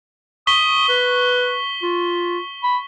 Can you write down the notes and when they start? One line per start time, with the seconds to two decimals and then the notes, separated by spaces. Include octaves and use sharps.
0.47 C#6 D#6 B6 G7
0.89 B4
1.83 F4
2.63 B5